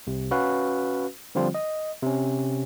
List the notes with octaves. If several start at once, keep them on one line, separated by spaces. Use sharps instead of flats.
C2 C3
C#4 F#4 B4 F5
D3 F3 G3 C4 F4
D#5
C3 C#4